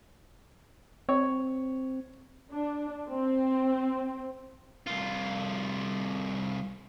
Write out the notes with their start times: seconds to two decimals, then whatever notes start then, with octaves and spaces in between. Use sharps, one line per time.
1.09 C4 C#5
2.52 D4
3.10 C4
4.87 C2 F4